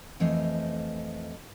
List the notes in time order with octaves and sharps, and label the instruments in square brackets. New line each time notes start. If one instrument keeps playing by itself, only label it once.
[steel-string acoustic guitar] F2 E3 A3 C5 D#5 F5